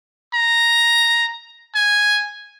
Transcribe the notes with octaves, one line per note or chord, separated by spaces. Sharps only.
A#5
G#5